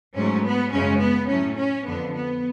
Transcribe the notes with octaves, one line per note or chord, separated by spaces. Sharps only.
G#2 F#3 A3 C#4
B3
F#2 C#3 G#3 C#4
B3
A2 F#3 A3 C#4
C#4
F2 D3 F3 B3
B3